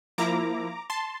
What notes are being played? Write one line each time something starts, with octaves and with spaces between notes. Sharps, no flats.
F3 A#3 E4 A#5 D6
A5 C6